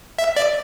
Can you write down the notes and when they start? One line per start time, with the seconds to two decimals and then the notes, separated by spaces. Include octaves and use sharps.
0.19 E5
0.37 D5